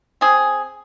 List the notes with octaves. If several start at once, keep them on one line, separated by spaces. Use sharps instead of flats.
C4 G#4